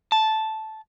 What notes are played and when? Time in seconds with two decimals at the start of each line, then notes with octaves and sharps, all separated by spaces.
0.12 A5